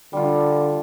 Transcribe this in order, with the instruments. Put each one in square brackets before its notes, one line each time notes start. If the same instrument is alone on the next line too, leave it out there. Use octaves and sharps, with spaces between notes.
[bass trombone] D3 [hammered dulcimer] G3 F4